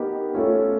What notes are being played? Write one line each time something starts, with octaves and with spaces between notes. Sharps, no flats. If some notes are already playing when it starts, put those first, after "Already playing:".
Already playing: B3 D#4 G4 A#4
A3 C#4 F4